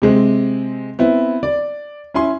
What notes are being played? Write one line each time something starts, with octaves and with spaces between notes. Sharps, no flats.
C3 G#3 C4
B3 C4 E4
D5
C#4 E4 G#5 C6